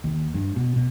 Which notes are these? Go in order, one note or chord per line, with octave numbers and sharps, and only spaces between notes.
D#2
G2
B2
B2